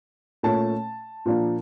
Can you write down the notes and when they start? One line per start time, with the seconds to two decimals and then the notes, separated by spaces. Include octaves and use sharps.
0.43 A#2 A3 C#4 A5
1.26 A#2 F3 A#3 D4